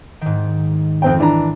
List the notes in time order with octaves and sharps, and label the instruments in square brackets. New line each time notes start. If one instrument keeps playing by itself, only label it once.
[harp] G#2 D#3
[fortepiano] F2 C4 G5
E3 D4 A#5